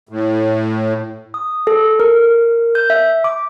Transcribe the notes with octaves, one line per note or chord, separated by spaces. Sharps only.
A2
D#6
A4
A#4
G6
E5
D6